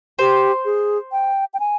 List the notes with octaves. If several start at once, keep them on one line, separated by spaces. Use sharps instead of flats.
G4 C5
G#4
G5
G5
G#5